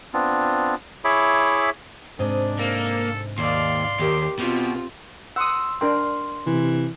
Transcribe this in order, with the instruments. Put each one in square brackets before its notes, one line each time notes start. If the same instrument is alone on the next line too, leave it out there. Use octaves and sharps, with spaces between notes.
[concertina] B3 C4 D4 F4
E4 G#4 C#5 E5 B5 D6
[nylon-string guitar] G#2 C3 D#5 [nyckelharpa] D4
[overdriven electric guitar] A#3 [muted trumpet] A4
[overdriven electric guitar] D#2 [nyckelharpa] D5 F5 [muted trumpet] C6
[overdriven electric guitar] D#2 [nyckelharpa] G4 A#4
[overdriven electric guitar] B2 [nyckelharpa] C4 F4 [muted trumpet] G4
[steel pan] F#5 D#6 [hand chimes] C6 E6
[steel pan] D4 A#4 G5 [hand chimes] C6
[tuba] C3 [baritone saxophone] E3